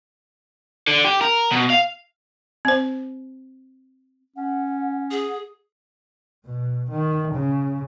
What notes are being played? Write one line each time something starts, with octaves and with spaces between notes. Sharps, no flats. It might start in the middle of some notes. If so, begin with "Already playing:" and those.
D3
G4
A#4
B2
F5
C4 C5
C#4 F#5
G#4 F#5
B2
D#3
C#3